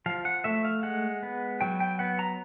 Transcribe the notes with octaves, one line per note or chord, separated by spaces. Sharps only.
F3 F5
F#5
A3 E5
F5
G#3 F#5
B3
F#3 G5
G5
B3 F#5
A#5